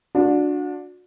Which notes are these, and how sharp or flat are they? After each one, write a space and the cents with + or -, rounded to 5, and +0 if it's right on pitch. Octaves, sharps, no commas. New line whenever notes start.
D4 +0 F#4 -35